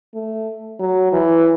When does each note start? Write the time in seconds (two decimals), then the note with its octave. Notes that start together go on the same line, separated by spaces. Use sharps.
0.14 A3
0.79 F#3
1.12 E3